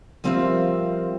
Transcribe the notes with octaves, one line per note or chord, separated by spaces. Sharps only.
F3 G3 C4 F4 A#4 E5